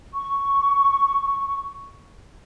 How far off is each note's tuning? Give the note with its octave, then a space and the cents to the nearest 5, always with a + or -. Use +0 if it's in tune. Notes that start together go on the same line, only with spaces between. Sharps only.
C#6 +5